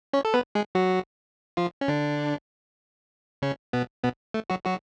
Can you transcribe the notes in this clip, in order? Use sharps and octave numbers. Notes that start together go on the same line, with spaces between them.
C#4 C#5
A4
B3 B4
G#3 G#4
F#3 F#4
F3 F4
C#4
D3 D4
C#3 C#4
B2 B3
B2 B3
A3
F#3 F#4
F#3 F#4